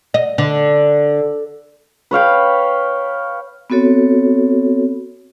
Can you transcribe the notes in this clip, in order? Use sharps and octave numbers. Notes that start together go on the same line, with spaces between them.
D#5
D3
B4 C#5 F5 G5
B3 C4 F#4 A4 C#5